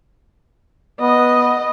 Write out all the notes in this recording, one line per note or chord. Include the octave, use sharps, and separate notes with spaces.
B3 D#5